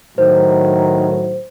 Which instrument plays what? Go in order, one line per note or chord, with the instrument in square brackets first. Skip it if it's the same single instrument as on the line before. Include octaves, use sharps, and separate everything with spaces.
[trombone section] A2 D#3 F#3 [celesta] C5